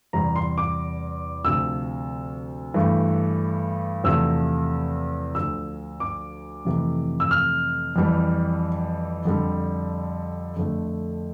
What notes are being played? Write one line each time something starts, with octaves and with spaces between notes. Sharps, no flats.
E2 C3 G3 A#5
C6
D6
D2 C3 F3 E6
G2 E3 A3
E2 C3 F3 A3 E6
D2 D3 F3 E6
D6
F2 C3 E3 A3
E6
F6
F2 E3 G3
F2 D3 G3
F2 D3 A3